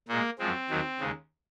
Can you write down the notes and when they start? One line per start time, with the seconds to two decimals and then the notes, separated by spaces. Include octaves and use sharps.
0.08 A#2 G#3 A#3
0.39 F#2 F3 G#3 C4
0.69 D#2 D#3 F#3
1.00 D#2 C#3 G#3